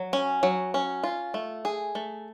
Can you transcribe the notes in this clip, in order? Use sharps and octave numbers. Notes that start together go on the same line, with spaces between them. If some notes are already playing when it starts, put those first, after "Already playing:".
Already playing: F#3
C#4
F#3
C#4
F4
A3
G#4
A3